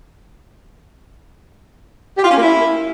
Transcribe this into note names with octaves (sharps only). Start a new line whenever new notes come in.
G4
F4
C#4
A#3
E4